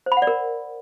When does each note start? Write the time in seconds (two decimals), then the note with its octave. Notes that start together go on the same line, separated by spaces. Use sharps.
0.06 C5
0.12 B5
0.17 F#5
0.22 D5
0.27 A#4